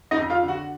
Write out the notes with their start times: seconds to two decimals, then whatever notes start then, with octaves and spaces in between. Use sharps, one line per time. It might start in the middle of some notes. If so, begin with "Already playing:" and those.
0.11 D#4 D#5
0.17 F2
0.30 F4 F5
0.43 D3
0.48 F#4 F#5